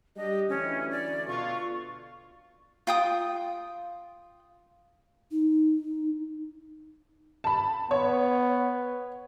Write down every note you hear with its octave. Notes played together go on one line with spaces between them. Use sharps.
G3 D4 G4 D#5
D2 E3 C#4
D5
B2 D3 F4 C#6
F4 G5 D#6
D#4
A5 B5
B3 C#5